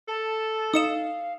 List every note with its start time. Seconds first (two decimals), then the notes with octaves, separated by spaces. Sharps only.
0.08 A4 A5
0.74 D#4 D#5 F5 D#6 C#7 E7